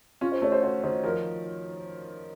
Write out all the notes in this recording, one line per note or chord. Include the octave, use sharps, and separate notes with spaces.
C#4 F4
C5
A3 C#5
C5
F#4 C5
D#3 C5
F3 A#4